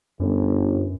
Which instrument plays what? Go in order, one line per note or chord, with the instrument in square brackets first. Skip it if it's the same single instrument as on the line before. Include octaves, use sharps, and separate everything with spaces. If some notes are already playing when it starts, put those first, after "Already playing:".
[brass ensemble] G1 [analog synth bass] F#2